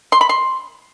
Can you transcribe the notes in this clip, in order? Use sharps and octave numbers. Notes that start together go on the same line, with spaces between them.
C6
B5
C6